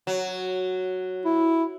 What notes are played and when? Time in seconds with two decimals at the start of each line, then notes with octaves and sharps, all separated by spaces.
0.07 F#3
1.25 E4